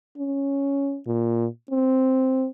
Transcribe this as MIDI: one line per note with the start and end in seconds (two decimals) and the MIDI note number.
0.18 0.98 61
1.07 1.46 46
1.71 2.47 60